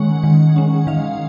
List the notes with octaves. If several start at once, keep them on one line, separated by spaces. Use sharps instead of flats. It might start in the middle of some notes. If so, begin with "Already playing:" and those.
Already playing: D#3 G#3 C#4 F#5
D#3
G#3 C#4
D#3 F5